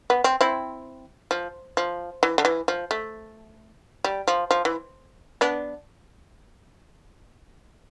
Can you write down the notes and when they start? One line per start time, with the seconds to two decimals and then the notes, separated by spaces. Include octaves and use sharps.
0.10 B3
0.24 C4
0.41 C4 E4
1.31 F3
1.77 F3
2.23 E3
2.38 D3
2.45 E3
2.68 F3
2.91 A3
4.04 G3
4.28 F3
4.51 F3
4.65 E3
5.41 B3 D4